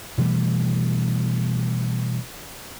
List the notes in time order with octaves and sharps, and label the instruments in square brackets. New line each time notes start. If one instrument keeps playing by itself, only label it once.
[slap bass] B2 E3 G3 A3